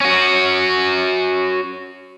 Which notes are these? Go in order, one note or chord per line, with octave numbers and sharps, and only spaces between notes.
C#4 F#4